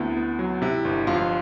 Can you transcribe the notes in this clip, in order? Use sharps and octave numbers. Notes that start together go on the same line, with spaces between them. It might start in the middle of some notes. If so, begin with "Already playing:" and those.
Already playing: D2 B3 C4 E4
B3
F#3
C3 E4
G1
F2 F4